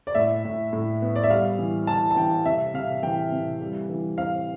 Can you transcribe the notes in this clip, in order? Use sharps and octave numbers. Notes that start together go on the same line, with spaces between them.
D5
A2 E5
A2
A2
B3
D5
E5
G3 F5
E3
E3 A5
A5
E3 G5
C3 E5
C3 F5
E3 G5
C3
G3
E3
C4 F5